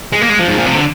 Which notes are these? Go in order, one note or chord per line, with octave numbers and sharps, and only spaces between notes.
G#3
A#3
G#3
F3
G#2
A#2
C3
D3